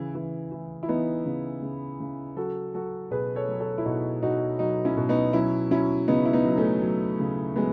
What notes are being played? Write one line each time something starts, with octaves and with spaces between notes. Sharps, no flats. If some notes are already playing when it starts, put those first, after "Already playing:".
Already playing: C#3 E3
E3
E3
E4
E3 B3 D#4
C#3
C#3
C#3
F#3 F#4 A4
F#3 F#4 A4
B2 G#4 B4
A4 C#5
F#3
A4 C#5
E4
B2 D#4 F#4
B2 D#4 F#4
F#3 D#4 F#4
C#4 E4
B2
B3 D#4
F#3 C#4 E4
F#3 C#4 E4
C#3 B3 D#4
E4
B3 D#4
F#3
A3 C#4
F#3
C#3
F#3 G#3 B3